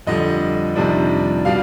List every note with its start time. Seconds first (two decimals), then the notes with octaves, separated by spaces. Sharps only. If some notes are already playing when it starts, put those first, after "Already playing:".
0.07 F2 D3 G3 D#5
0.75 F2 C3 D#3 G3 D4
1.45 B2 G3 D4 F5